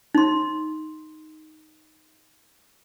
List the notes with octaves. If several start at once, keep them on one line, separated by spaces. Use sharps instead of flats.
D#4 C6